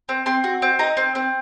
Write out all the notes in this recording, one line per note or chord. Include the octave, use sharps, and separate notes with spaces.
C4
C4 C6
F#4
C4
D#4 A#5
C4
C4